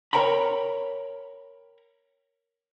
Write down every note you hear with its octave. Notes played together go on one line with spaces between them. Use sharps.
A#4 C#5 G5 A#5 B5